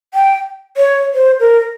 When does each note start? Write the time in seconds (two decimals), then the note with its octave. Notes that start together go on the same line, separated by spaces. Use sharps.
0.14 G5
0.77 C#5
1.14 C5
1.40 A#4